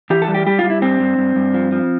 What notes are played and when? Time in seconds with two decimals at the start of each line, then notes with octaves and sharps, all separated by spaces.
0.10 E3 G4
0.22 A4
0.28 G3
0.34 G4
0.46 G3 G4
0.59 G3 F4
0.70 E4
0.82 G2 C4
0.99 G2
1.18 G2
1.36 G2
1.54 F3
1.72 F3